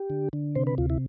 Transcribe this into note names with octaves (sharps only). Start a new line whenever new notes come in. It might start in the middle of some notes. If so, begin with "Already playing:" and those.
Already playing: G4
D3
D3
C3 C5
B4
D2 F4
E4